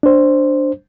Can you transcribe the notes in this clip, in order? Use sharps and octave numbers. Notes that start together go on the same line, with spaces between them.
D4 C5